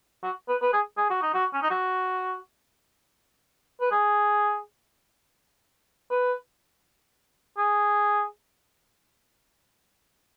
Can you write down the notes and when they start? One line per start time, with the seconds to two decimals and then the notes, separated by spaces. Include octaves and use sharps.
0.23 F#4
0.48 B4
0.62 B4
0.73 G#4
0.97 G#4
1.10 F#4
1.22 D#4
1.34 F#4
1.53 C#4
1.62 D#4
1.70 F#4
3.81 B4
3.91 G#4
6.11 B4
7.57 G#4